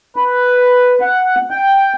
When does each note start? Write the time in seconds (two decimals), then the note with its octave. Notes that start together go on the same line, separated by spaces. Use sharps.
0.16 B4
1.01 F#5
1.50 G5